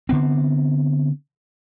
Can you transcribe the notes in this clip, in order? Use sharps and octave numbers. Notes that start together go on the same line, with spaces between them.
D3 B3 C4